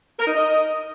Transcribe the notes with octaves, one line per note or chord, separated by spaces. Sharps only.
A#4
D#4
D#5